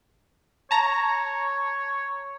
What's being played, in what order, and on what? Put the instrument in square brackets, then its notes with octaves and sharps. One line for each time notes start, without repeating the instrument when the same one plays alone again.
[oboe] C#5 [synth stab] A5 A#5